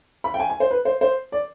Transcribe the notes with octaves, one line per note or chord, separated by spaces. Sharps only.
B5
G5
G#5
G#5
C5
B4
C5
C5
D5